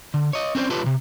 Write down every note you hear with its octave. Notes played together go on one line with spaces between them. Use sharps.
D3
C#5 D#5
C4 C#4 B4 C5 D5
F4 G4 A4 B4 C#5
C2 C3